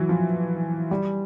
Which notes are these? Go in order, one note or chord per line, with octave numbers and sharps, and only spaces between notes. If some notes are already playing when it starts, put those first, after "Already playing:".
Already playing: E3 F#3
F3
G3